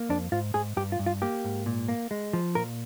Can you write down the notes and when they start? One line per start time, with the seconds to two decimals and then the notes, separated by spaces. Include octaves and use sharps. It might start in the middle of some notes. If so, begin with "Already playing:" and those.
Already playing: A#3
0.09 F2 D4
0.32 G#2 F4
0.54 G#2 G#4
0.77 G2 G4
0.92 F4
0.99 G2
1.06 F4
1.22 A#3 G4
1.45 G#2
1.66 A#2
1.88 A#3
2.11 G#3
2.33 F3
2.55 A#2 A#4